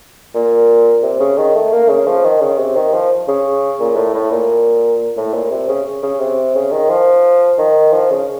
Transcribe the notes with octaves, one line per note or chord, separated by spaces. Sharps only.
A#2
C3
C#3
D#3
A3
A#3
C#3
F3
D#3
C#3
C3
D#3
F3
C#3
A#2
A2
A2
A#2
A2
A#2
C3
C#3
C#3
C3
C#3
D#3
F3
D#3
F3
C#3